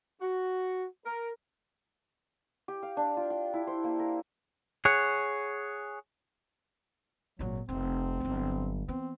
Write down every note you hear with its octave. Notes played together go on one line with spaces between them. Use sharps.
F#4
A#4
G4
F5
D4
F4
G5
E4
C5
A#3
A#4
G#4 C#5 F#5
G#1 A#2 F#3
F1 C4
G1 F#3
E3 B3 C4